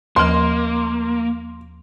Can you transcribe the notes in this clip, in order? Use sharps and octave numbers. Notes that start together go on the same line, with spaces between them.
D#2 F3 A#3 C6